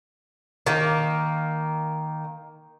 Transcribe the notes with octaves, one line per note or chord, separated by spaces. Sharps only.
D#3 A#3